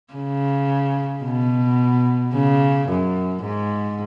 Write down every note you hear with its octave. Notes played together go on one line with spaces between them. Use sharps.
C#3
B2
C#3
F#2
G#2